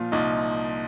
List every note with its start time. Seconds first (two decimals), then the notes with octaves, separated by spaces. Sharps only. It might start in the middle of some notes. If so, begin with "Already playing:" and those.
Already playing: A#2 F3 F4
0.12 C2 D#4